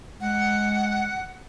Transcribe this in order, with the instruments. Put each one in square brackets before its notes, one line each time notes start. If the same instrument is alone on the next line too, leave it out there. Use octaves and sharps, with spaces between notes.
[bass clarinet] G#3 [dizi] F#5